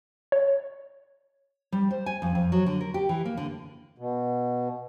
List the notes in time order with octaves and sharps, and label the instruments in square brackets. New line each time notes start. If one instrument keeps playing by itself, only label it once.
[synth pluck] C#5
[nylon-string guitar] G3
C5
G#5
F2
F2
F#3
D3
A#4
G4
E3
A#3
D3
[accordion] B2